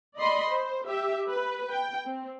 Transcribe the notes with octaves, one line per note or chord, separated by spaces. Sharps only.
D5 D#5 B5 C6
C5
G4 E5
B4
G5
C4